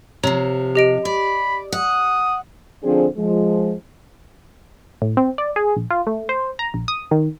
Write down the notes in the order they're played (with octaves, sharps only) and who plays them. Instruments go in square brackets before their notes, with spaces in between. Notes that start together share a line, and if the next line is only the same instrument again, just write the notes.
[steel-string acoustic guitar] C3 F3 [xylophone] C#5 A#5 F7
[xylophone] G4 D#5 D7
[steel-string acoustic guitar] D5 [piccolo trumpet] B5
[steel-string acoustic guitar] F#5 [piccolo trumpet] D#6
[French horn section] D3 F3 C4 D4 G#4
F3 G#3
[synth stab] A2
C4
D5
G#4
A#1
F4
A3
C5
A#5
A#1
D#6
D#3